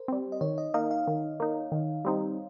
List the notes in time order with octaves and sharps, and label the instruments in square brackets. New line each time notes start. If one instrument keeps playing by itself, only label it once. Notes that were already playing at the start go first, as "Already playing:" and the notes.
Already playing: [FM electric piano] A#4 C5
[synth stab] G3 C4
[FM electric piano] D#5
[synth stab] D#3 [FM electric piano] C#5
[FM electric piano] D#5
[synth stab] A#3 D#4 [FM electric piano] F5
[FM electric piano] F5
[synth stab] D#3
A#3 D#4
D#3
G3 C4 D#4